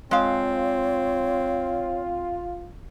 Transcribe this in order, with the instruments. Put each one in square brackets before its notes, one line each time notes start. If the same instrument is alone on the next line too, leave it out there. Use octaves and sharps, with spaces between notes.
[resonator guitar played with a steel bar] G#3 F5 [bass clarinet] C4 [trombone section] F4 [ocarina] C#5